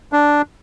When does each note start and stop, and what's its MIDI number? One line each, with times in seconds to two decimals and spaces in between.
0.13 0.42 62